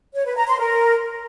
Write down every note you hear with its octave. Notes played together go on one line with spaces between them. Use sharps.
C#5
B4
A#5
C6
A#4